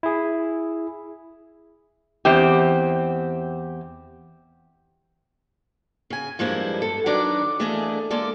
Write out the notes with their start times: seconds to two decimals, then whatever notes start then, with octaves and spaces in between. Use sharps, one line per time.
0.03 E4 G#4
2.25 E2 C4 G4
6.10 C#3 G#5
6.39 G2 F3 G#3 A#3 E4
6.82 A4
7.06 D#3 F#3 D4 B4 D5 A#5
7.59 E3 A3 A#3 D4 G#4 D#5
8.10 G#3 A#3 A4 D5